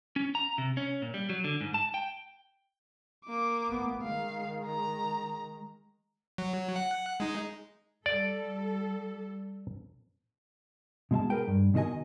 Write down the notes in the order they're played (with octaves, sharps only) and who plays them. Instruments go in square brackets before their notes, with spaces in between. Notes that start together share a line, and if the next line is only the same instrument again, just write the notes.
[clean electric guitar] C#4
A#5
C3
C#4
A#2
G3
F#3
D3
G#2
A5
G5
[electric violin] A#3 D6
[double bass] A1 B3
[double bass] D#3 G#3 [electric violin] F5
[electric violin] A#5
[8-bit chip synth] F#3
F#5
G#3 D#4
[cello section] G3 A4 [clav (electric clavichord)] D5
[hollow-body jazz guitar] B2 G#3 E5 A5
G#4 A#4 B4 G5
G2
B2 D#3 F#4 D#5 G#5